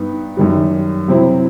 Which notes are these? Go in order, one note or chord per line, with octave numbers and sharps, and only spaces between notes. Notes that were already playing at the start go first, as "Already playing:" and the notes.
Already playing: G2 B3 D#4
F#2 D#3 G3
C3 F#3 C4 E4